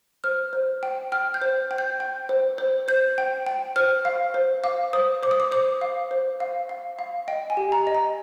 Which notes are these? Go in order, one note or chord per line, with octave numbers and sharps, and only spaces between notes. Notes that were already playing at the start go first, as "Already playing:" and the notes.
C5 F6
C5
G5
G5 F6
G6
C5
G5
G6
G5
C5
C5
C5 G6
G5
G5
C5 F6
F5
C5
F5 D6
C5 D#6
C5 D6
D#6
D6
C5 D6
F5
C5
F5
F5
F5
D#5 G5
G#5
G4
A#5
D#5
A#5